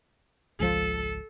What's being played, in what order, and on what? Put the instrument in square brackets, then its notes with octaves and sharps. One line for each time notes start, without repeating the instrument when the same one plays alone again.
[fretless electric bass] G#1 C#2 F3 [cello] A4